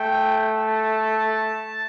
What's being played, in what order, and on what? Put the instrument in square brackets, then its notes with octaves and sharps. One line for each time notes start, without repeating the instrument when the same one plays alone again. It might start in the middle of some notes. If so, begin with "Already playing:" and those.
Already playing: [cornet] A3 [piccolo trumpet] G5
[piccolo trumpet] A5